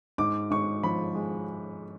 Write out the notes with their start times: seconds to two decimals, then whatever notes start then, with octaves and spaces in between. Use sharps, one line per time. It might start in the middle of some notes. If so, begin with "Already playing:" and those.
0.18 G#2 D6
0.50 G#2 C#6
0.83 F3 B5
1.15 G#3